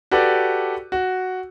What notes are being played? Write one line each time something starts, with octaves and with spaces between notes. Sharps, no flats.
F#4 G4 A4 B4 D5
F#4